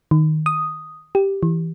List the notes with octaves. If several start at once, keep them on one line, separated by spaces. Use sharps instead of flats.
D#3
D#6
G4
E3